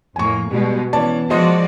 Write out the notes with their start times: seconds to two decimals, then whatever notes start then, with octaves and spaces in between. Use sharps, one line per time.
0.16 F2 A2 A#3 G#5 C#6
0.51 B2 G3 G#3 B3
0.93 E3 B3 C#4 D5 A5
1.30 F3 G#3 F#4 C5 D5 D#5